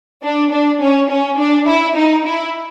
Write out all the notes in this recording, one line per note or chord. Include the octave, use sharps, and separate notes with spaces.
D4
D4
C#4
C#4
D4
E4
D#4
E4